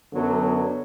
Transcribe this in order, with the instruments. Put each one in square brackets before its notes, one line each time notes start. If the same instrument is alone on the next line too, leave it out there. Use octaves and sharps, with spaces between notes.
[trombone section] F#2 D3 F#3 B3